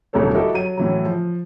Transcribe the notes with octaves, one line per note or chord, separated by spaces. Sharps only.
D#1 D2 C3 F#3 A4 C#5
E4 F#4 G4 A4 A#4 D#5
F#3 D#7
A2 E3 F#3
F3